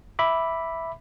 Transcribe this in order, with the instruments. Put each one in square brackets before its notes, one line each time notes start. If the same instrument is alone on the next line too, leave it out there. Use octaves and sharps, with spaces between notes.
[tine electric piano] E5 B5 D6